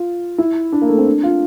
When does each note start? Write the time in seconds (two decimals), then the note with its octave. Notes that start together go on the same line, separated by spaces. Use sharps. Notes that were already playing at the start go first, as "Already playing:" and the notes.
Already playing: F4
0.38 E4
0.72 D4
0.81 A#3
0.89 A3
0.98 C4
1.07 D4
1.23 F4